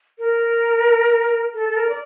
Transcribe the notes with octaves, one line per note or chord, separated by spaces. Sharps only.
A#4
A4
A4
A#4
D5